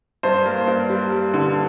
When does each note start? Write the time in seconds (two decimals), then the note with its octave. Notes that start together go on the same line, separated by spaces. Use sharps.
0.23 G2 C5
0.45 A#3
0.67 G2
0.90 G3
1.12 G3
1.34 D3